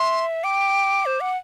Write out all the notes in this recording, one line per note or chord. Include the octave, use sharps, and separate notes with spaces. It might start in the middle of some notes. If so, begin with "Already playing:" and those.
Already playing: E5 C6
G5 D6
C5
F#5